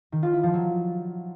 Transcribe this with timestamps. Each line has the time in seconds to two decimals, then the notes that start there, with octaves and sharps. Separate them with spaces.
0.12 D#3
0.23 F4
0.33 E4
0.43 F3
0.54 F#3